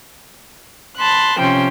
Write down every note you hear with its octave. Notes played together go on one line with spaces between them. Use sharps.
A5 B5 C6 F#6
C3 F3 C#4 G5 C6